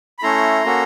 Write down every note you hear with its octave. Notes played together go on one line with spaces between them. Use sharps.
B5
A3 C#4 E4 A4 A#5 C6
A#3 C#4 F#4 A4